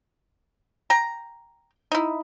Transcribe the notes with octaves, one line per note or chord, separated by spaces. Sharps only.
G5 A#5
D#4 E4